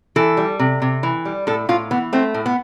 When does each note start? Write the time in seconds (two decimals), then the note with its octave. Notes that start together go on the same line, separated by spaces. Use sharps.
0.16 E3 A4
0.37 G3
0.59 C3
0.82 C3
1.03 E3
1.25 G3
1.47 A2 A4
1.69 A2 F4
1.91 E3 B3
2.13 A3 C4
2.34 A2
2.46 B3